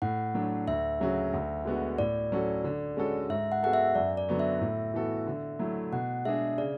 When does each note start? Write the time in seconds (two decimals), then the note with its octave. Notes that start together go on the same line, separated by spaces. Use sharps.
0.02 A2 F#5
0.35 F#3 A3 D4
0.67 D2 E5
1.00 C#3 F#3 C#4 F#4
1.33 D2
1.65 D3 G#3 B3 F#4
1.98 A2 D5
2.32 F#3 C#4 F#4 A4
2.64 D3
2.97 G#3 C#4 F#4 A4
3.30 G#2 E5
3.52 F#5
3.63 G#3 B3 F#4 A4 F#5
3.73 E5
3.95 F#2 D5
4.17 D5
4.29 D3 F#3 B3 F#4
4.39 E5
4.61 A2
4.94 E3 B3 F#4 A4
5.27 D3
5.59 F#3 A3 E4
5.92 B2 F#5
6.25 G#3 D4 G#4 E5
6.58 C#3 D5